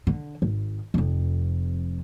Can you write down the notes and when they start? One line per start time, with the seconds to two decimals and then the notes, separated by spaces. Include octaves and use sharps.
0.07 D3
0.42 G#1
0.94 F1 F2